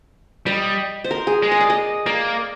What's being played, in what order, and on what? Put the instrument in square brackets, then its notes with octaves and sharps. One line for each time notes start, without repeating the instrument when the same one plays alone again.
[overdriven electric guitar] G3 [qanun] D#5
[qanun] C5
A#4
G#4
[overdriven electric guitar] G#3
[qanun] D#5
D5
D#5
[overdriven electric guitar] A#3 [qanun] D5